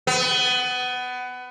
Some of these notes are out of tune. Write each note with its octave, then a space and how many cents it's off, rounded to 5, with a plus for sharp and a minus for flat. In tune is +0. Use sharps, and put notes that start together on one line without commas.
B3 +20